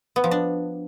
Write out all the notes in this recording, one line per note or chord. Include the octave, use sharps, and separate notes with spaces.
B3
F3
D4